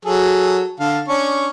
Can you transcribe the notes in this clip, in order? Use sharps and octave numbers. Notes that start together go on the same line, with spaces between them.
F#3 G#4 A4
D3 F5 A5
C#4 D4 C#6